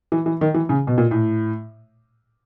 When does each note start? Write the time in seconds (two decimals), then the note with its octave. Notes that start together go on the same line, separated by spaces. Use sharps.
0.12 E3
0.26 E3
0.41 D#3
0.54 E3
0.69 C#3
0.87 B2
0.98 A#2
1.11 A2